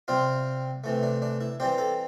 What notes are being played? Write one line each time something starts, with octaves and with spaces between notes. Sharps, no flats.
C3 G3 C4 F4
C3 E3 A3
D4
D4
E4
E3 G3 C4 G4
A4